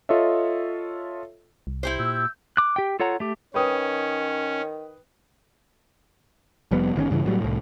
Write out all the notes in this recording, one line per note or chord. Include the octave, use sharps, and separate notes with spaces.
F4 A4 C#5 D#5 E5
C2
E4 G4 C5
A#2 E6 G6
D6 F#6
G4 G5
F4 A4 C#5 F#5 A#5
A3 G4
D#3 C#4 B4 G5 D#6
F1 F2 G3 B3
G1 D#3 C4 C#4
G2 C#3 E3
A2 F#3 G3
C2 A2